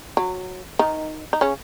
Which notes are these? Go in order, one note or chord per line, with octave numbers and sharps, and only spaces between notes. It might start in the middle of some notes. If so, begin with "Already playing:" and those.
F#3
D#3 D#4
D#4
C#3 C#4